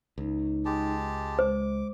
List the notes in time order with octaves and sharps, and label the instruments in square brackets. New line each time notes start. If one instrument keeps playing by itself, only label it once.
[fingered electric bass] C#2 [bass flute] D#4
[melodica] G#3 G4 A5
[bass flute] G#3 [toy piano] C5 [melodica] D6